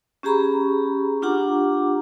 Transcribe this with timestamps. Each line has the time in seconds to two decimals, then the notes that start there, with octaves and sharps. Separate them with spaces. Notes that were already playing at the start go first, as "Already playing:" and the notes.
0.23 C#4 G4 G#4 A#5 B5 C#6
1.22 D4 F4 G4 F#5 A#5 D6